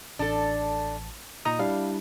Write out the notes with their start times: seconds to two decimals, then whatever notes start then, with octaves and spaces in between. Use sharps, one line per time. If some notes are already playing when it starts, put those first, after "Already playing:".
0.19 A1 D4 A4 A5
1.45 A#2 D#4 D#5 A#5 D#6
1.59 G3 D4 E4 F5